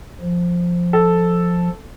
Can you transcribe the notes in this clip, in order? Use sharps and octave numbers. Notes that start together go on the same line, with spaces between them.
F3
A4